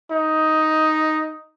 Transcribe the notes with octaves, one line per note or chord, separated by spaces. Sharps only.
D#4